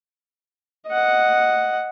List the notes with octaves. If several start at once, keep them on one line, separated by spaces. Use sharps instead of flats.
D#5 F#5